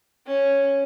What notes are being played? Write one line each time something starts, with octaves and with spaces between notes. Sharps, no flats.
C#4